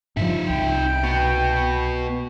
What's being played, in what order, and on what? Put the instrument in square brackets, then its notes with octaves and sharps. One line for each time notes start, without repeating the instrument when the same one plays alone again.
[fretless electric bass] G2 C#3 F3 [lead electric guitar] D#4 E5
[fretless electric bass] C2 [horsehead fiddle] G5
[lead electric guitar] B3 F#4